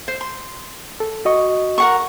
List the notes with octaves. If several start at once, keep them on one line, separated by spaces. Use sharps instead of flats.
C5
C6
A4
F#4 D#5 C#6
A#4 F#5 C#6